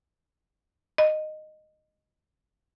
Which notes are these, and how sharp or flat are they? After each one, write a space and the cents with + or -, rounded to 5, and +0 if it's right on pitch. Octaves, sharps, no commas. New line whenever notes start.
D#5 -10